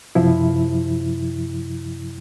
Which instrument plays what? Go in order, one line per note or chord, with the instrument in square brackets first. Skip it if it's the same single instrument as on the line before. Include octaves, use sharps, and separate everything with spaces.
[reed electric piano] F#2 C3 F3 E4